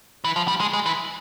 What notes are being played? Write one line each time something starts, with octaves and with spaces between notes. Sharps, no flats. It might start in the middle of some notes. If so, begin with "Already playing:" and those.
E3
F3
G3
G#3
G#3
E3